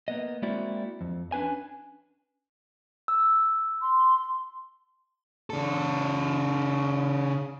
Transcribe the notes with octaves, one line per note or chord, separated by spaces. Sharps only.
A#3 B3 D#5
G#3 A#3 C4 E4 F#4 D5
F2
C#4 D4 B4 G#5
E6
C6
C#3 A4